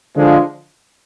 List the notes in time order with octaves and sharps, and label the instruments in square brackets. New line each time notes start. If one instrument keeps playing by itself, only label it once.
[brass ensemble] D3 F3 G#3